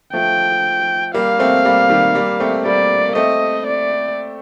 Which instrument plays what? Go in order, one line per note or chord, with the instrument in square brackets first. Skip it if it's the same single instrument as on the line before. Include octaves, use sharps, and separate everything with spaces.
[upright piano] F3 A3 [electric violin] G5
[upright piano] G3 A#3 [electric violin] F5
[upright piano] A3 C4
G3 A#3
D#3 G3
G3 A#3
A3 C4
[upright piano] G3 A#3 [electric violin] D5
[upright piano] A#3
[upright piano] A3 C4 [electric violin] D#5
[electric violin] D5